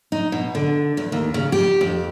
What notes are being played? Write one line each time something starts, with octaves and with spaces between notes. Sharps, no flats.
D#4
B2
D3
E2
D#2
C#3
G4
F2